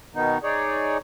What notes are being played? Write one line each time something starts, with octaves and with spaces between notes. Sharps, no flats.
B2 D#3 B3 D#4
D#4 G#4 C#5 D5